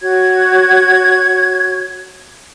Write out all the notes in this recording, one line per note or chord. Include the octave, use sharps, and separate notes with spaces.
F#4 C#5 G#6